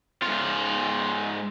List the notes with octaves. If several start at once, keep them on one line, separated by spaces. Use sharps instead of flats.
G#2 F4